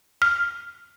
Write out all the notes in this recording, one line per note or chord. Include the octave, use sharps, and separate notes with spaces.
F6